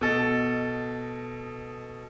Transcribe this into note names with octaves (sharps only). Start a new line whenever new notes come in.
B2 A4 D#5